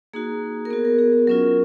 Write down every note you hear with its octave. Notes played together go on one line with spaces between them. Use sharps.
A#3 D#4 F#4 G#4
A#4
B3 F#4 G#4
A#4
G#4
G#4
F#3 C#4 F4 A#4